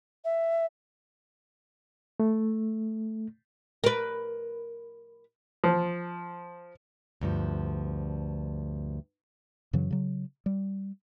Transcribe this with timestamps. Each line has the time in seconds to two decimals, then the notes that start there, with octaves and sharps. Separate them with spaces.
0.25 E5
2.20 A3
3.84 A#4 B4
5.64 F3
7.21 D2 G2 F3
9.73 F#2 C#3 E3 F#3
9.91 C#3 F#3
10.46 G3